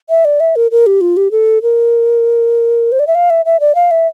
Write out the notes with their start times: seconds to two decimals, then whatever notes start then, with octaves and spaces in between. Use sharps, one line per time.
0.09 E5
0.25 D5
0.40 E5
0.56 A#4
0.71 A#4
0.86 G4
1.01 F4
1.17 G4
1.31 A4
1.62 A#4
2.92 C5
2.99 D5
3.07 E5
3.15 F5
3.30 E5
3.45 E5
3.60 D5
3.75 F5
3.91 E5